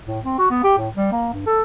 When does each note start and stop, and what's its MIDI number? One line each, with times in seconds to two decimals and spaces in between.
0.07 0.19 45
0.25 0.36 60
0.39 0.48 66
0.50 0.64 59
0.64 0.77 67
0.79 0.89 45
0.95 1.10 55
1.12 1.29 58
1.33 1.46 43
1.47 1.63 69